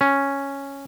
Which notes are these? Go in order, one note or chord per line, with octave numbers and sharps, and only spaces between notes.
C#4